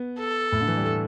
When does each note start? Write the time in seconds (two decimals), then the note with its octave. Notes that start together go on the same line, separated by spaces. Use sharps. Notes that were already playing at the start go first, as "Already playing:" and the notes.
Already playing: B3
0.19 A4
0.52 A2
0.61 D3
0.68 E3
0.77 G3
0.84 A3